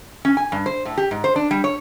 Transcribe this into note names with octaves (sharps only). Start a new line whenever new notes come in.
C#4
G#5
G2
C5
A2
G4
G#2
C5
D4
G3
C#5